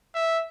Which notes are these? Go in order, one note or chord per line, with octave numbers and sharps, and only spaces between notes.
E5